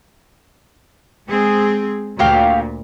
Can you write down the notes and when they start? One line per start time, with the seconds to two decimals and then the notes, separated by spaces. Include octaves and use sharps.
1.28 G#3 C4 G#4
2.19 D2 A#2 F#4 G4 F5